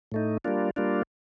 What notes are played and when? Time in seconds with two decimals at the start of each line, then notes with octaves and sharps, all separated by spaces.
0.12 A2 A3 D#4
0.45 G3 A#3 D4 F4
0.76 G3 A#3 D4 F4